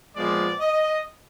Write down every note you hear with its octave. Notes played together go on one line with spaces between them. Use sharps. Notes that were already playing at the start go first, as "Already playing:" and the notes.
A#2 F3 G#3 B3 D5
D#5